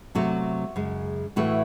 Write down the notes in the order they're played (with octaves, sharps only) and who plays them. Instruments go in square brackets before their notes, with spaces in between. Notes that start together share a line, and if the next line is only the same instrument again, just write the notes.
[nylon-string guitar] C3 F#3 A3 F#4
F#2 C#3 G#3
A2 E3 A3 F#4